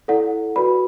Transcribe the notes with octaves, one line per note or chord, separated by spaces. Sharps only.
E4 A4 D5 F#5
F#4 B4 D5 B5